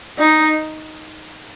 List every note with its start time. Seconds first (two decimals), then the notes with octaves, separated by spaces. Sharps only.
0.19 D#4